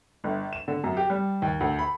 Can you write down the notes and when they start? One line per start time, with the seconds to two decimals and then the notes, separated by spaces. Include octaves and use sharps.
0.24 G1
0.53 E7
0.68 D3
0.84 F#2
0.97 G4
1.10 G3
1.42 D#2
1.60 D2
1.79 B5